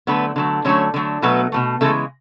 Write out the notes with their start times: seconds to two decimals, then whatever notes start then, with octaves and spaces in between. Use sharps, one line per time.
0.07 D3 F#3 A3 B3 B4
0.36 D3 F#3 A3
0.65 D3 F#3 A3 C#4 C#5
0.94 D3 F#3 A3
1.22 B2 F#3 A3 B3 B4
1.52 B2 F#3 A3
1.81 C#3 E3 G#3 A3 A4